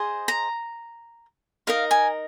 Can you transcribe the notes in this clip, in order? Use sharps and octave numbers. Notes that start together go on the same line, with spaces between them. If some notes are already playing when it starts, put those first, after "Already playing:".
Already playing: G#4 C5 D#5
A#5
D#4 A#4 D#5 F5
G#5